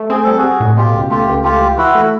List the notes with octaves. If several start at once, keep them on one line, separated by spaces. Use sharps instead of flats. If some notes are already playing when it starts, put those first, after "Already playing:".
Already playing: A3
C4 G#4
G3 A4
F#4 G#4
G3
A2
B2 F4 G4
C#2
A3 F4 G4
C#2
A3 F4 G4
E3
E3 E4 F#4
A3